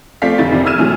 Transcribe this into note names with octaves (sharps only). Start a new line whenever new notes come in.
F3 A3 C4 D5 F5 B6
F1 D3 D#4 E4 A6
F2 C3 D#3 C4
E6 F6 G#6 D#7 E7
A2 C3 D#3 E3 F#3 G#3